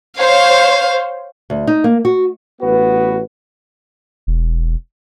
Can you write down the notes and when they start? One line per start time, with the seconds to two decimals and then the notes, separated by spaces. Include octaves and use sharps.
0.18 C5 C#5 F5
1.50 D2
1.67 D#4
1.84 A#3
2.05 F#4
2.62 A1 B3 F#4 B4
4.27 E1